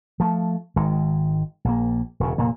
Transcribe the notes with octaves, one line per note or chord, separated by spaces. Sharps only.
F3 A3
G#1 D#3 G#3
A#1 A#3
E1 E2 C#3
F1 A#2 A#3